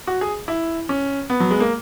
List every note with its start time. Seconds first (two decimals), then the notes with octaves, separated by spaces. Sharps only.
0.07 F#4
0.21 G#4
0.48 E4
0.89 C#4
1.30 B3
1.40 F#3
1.51 G#3
1.60 A#3